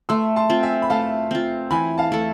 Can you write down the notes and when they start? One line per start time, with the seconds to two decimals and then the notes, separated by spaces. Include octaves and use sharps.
0.09 A3 C6 E6
0.36 A5 C6
0.50 C4 F4
0.63 E5 G#5
0.82 B5
0.90 A3 F5 A5
1.31 C4 F4
1.71 E3 G#5 B5
1.98 F5 A5
2.12 A3 E4 A4